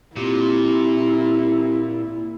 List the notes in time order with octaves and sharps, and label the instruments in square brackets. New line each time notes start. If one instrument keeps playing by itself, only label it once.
[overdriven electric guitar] A#2 [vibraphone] C4 F4 G4 [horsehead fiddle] E4